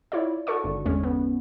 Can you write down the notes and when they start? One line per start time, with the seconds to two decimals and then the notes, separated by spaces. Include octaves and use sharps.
0.12 E4 F4 C#5 D5
0.47 F#4 A4 D5 C#6
0.64 G#1 G2 D3
0.85 E2 G#3 C#4
1.03 B3